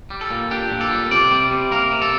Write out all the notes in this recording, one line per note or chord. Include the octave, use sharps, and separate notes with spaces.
G3
A4
A#2
D4 G4
A#2
A4
G3
C3 D5
G3
C3
A#3 A#4
C3
A4